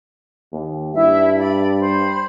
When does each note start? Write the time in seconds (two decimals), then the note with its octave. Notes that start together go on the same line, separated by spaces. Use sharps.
0.53 D#2
0.95 G2 E4 E5
1.38 D5 B5
1.80 C5 B5